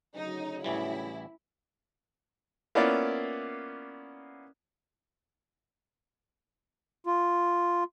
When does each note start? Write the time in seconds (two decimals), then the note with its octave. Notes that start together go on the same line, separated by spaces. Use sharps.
0.16 D2 C#3 F#3 D#4
0.64 A1 E3 G3 E4
2.75 A#3 B3 C#4 E4 F4 D5
7.06 F4